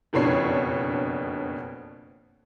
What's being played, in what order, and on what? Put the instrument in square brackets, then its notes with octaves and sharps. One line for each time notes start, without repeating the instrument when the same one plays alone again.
[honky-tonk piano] F#1 F2 B2 D4 C#5 C7